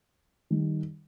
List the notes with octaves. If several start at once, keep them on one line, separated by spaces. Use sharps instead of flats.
D#3 G3